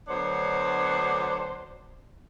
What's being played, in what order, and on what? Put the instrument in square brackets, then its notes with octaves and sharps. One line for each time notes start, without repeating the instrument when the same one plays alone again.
[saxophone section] D2 F#3 B3 D4 C5 C#5